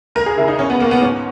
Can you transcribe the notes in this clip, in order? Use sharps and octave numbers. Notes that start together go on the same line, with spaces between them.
C#2 A#4
G#4
C#3 E4
D#4
B2 C#4
B3
B2 A#3
B3
G#2 C#4